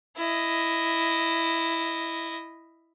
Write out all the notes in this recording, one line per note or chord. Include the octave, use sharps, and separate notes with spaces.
E4 D#5